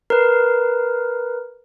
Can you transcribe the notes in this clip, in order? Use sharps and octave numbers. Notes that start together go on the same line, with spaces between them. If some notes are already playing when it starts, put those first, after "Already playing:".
A#4 B4